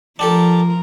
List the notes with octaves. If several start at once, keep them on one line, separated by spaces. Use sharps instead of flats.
F3 D4 G4 A4 A#4